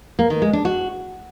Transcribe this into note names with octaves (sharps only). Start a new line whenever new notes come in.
A#3
D#3
G#3
D4
F#4